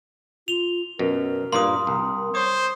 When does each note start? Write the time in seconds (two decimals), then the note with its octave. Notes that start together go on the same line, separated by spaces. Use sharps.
0.48 F4 F7 G7
0.99 F#2 B2 A#4
1.52 G2 A#2 A#3 C6 D#6
1.87 C2
2.35 C5 C#5 D#6